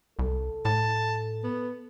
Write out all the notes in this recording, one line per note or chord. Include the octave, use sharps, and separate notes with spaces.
C2 A4
A2 A5
B3